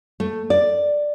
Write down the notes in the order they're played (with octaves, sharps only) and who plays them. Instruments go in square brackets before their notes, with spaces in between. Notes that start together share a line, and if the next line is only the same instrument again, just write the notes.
[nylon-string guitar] A3
D5